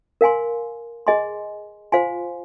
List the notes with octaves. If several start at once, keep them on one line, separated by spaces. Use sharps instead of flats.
A#4 F5 G#5 C6
G#4 D#5 G#5 C6
F4 C5 F5 G#5 C6